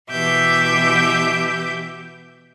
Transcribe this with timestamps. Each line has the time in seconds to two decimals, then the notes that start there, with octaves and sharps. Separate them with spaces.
0.10 B2 E3 G4 E5 D6 G6